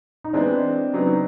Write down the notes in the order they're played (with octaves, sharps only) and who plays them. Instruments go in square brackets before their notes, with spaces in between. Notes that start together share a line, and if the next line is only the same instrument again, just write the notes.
[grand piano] D#4
[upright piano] E3 G#3 B3 [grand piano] C4 D4
[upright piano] C#3 F#3 B3 D#4